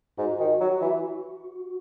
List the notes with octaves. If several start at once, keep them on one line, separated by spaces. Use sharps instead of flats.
G#2 F#4
D#3
F#3
E3